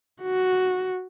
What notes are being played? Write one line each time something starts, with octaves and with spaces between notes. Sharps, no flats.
F#4